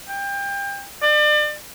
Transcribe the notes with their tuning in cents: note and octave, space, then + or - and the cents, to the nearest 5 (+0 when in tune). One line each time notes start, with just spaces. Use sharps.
G5 +30
D5 +35